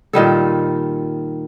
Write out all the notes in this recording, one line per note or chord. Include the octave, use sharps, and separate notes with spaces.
A#2 D#3 G3 A4